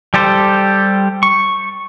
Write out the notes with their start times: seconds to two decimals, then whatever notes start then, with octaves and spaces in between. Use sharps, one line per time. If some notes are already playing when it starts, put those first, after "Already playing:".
0.14 G3 G4 A4 C5
1.23 C#6